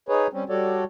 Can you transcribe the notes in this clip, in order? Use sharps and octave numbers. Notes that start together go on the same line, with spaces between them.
D#4 G#4 B4 C#5
G3 C4 C#4
G3 F#4 A4 C#5 D5